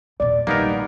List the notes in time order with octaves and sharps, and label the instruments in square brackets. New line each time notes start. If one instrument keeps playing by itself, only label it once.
[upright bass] D#2 A#2 [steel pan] D5
[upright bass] A#1 D#3 [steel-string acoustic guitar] G3 D#4 [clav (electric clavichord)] A#3 B3 A#4